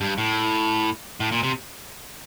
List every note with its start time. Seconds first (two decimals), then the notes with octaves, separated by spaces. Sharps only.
0.01 G2
0.18 A2
1.20 A2
1.32 A#2
1.43 C3